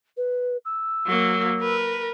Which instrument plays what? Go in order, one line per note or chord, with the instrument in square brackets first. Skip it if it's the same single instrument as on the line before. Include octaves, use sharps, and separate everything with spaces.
[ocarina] B4
E6
[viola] F#3 A#3
A#4 B4